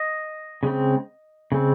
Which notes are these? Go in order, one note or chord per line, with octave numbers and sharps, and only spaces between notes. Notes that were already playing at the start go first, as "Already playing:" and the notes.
Already playing: D#5
C#3 G#3 C4
C#3 G#3 C4